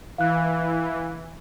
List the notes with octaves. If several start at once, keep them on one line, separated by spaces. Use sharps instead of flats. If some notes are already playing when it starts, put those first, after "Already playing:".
E3 F5 F#6